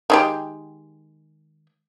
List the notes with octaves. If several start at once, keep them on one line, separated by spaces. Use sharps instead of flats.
D#3 G#3 G4